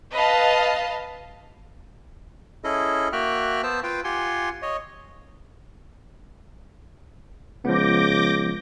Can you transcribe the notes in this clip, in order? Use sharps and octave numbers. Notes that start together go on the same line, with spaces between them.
B4 D#5 F5 A5
C#4 E4 G#4 A4 D#5
A#3 F#4 E5 G5 F6 F#6
B3 C5 A5 E6
F4 B4 F5 G5
F4 G4 F#5 G#5 C6
C#5 D#5
C#2 F3 B3 D6 G6 A#6